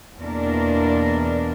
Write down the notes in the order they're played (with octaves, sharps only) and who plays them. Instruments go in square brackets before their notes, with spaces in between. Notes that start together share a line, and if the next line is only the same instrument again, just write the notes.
[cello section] E2 B2 A#3 D4 A#4